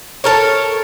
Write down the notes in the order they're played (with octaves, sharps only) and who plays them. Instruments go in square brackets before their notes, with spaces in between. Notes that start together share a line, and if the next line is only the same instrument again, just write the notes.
[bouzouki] A4 A#4 C#5